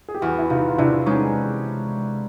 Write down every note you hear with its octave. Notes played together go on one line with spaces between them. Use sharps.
G#4
G4
E2 E4 F#4
E4
C3 D#4 F4
F4
C3 D4 E4
G#3 C#4 D#4